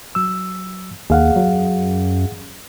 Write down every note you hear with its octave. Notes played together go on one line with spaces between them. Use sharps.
F#3 E6
D#2 G#4 F5 F#5
F#2